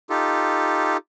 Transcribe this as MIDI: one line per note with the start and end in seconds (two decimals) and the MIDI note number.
0.10 0.97 63
0.10 0.97 65
0.10 0.97 67
0.10 0.97 69